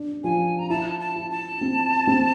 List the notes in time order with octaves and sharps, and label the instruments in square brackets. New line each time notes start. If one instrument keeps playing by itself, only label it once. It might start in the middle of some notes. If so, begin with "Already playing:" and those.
Already playing: [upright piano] D4
[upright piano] F3 [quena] G#5
[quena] A#5
[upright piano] E4 [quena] A5
[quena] A5
[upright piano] E4
[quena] A5
[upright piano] C4
C4